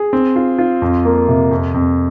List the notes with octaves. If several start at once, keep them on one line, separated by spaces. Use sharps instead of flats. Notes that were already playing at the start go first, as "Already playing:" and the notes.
Already playing: G#4
C4
F4
F4
F2
A#3
C3
F2
F2